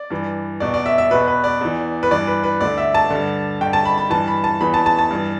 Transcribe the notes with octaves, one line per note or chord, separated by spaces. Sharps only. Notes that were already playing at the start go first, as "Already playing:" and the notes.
Already playing: D5
G2 E3
E2 B2 D5
D5
E5
E5
E2 B2 B4
B4
D5
E2 E3
B4
G2 E3 D5
B4
B4
D2 D3 D5
E5
A5
G2 D3
G2 D3 G5
A5
B5
B5
G2 E3 A5
B5
A5
E2 E3 B5
A5
A5
A5
G2 E3